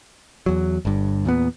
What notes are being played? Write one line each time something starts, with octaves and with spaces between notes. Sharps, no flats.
E2 F#3
G1 G2
E2 A#2 B3